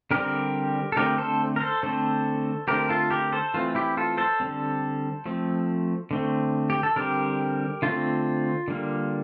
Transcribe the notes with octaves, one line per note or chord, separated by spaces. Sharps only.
D3 G3 C4 G4 A#4
A4
D3 A3 C4 G4 A#4
A4 C5
A#4
A4 C5
D3 A3 C4 A4 C5
D3 A3 C4 G4 A#4
F4 A4
G4 A#4
A4 C5
E3 A3 C4 F4
E4 G4
F4 A4
A4 C5
D3 G3 C4
F3 A3 C4
D3 A3 C4
G4
A4
D3 G3 C4 G4 A#4
D3 A3 C4 F4
D3 G3 A#3